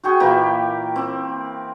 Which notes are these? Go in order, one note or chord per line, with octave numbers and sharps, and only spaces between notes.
F#4 G#4 G5 C#6
A#2 E3 A#3 G4
C4